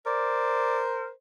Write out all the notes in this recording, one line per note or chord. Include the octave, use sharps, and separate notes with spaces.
A#4 C5 D5